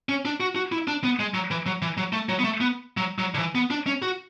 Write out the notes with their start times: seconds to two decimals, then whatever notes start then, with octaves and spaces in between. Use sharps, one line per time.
0.09 C#4
0.25 D4
0.40 F#4
0.56 F#4
0.72 E4
0.88 D4
1.04 B3
1.19 G#3
1.34 F#3
1.51 E3
1.66 F#3
1.82 E3
1.97 F#3
2.13 A3
2.29 F#3
2.39 B3
2.44 A3
2.61 B3
2.97 F#3
3.18 F#3
3.34 D3
3.39 E3
3.55 B3
3.70 D4
3.87 C#4
4.02 F#4